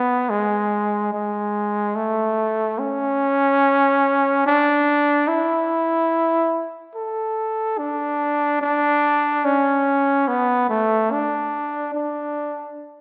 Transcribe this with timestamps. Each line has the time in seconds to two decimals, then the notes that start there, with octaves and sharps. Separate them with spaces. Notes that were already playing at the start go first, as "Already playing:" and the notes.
Already playing: B3
0.30 G#3
1.13 G#3
1.96 A3
2.79 C#4
4.46 D4
5.28 E4
6.95 A4
7.78 D4
8.62 D4
9.45 C#4
10.28 B3
10.69 A3
11.11 D4
11.95 D4